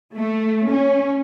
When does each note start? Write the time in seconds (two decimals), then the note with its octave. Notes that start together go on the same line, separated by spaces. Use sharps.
0.16 A3
0.70 C#4